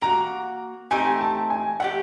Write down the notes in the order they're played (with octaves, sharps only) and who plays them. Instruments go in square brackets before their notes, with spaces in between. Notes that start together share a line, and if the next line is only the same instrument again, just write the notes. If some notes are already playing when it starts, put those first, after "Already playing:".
[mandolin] A#3 D#4 F#4 [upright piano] A#5
[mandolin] A3 C4 D#4 G4 [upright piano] G#5
[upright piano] A5
G#5
[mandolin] A3 D4 G4 [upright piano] F#5